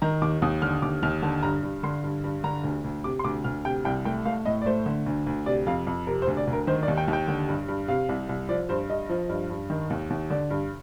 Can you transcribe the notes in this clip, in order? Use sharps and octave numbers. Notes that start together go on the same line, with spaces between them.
D#3 A#5
D#2 D6
D#2 D#6
D3 F6
D#2 D6
D#2 F6
D3 A5
G2 A#5
G2
D3 C6
G2
G2
D3 A#5
D2
D2
C3 D6
C6
D2 D6
D2 F6
C3 G5
C2 G5
A3 G5
A3 F5
A2 D#5
D5
A3 C5
D3
D2
D2
C3 D5
F2 F5
F2
C3 A#4
C5
D2
D5
D2
A#4
D#3 C5
D5
D#2
G5
D#2
G5
D3
G2
G2
C3 F5
C2
C2
F3 D5
G2 C5
G2 D#5
F3
G2
G2
D#3
D#2
D#2
D3 D5
G2